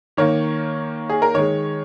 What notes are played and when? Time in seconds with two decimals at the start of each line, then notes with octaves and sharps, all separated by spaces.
0.17 D#3 A#3 C#5
1.09 G#4
1.22 A#4
1.34 D#3 G#3 C#5